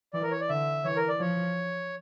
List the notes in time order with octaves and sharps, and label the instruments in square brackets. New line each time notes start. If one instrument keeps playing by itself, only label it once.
[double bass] E3 [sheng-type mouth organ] D5
[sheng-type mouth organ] A#4
C#5
D5
[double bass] D3 [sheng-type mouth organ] E5
[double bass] E3 [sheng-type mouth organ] C#5
[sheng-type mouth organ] A#4
D5
[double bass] F3 [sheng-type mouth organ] C#5